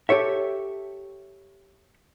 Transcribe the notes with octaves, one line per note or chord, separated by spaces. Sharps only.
G4 A4 C#5 E5